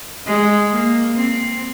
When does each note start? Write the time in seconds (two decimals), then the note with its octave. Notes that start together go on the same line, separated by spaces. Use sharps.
0.26 G#3
0.71 A#3
1.16 C4